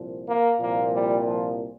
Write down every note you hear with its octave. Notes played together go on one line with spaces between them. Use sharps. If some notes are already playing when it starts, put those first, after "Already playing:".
Already playing: C2 A#2 F3
A#3
C2 A#2 F3 A#3
G3
F3